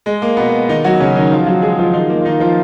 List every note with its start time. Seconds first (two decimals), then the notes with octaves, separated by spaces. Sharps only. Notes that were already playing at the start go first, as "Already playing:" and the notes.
0.06 G#3
0.22 A#3
0.37 B2 B3
0.69 D#3 D#4
0.84 F#3 F#4
1.00 C#3 C#4
1.16 D#3 D#4
1.32 F3 F4
1.47 F#3 F#4
1.62 G#3 G#4
1.79 F3 F4
1.93 D#3 D#4
2.10 A#3
2.20 F4
2.25 D#3 D#4
2.40 F3 F4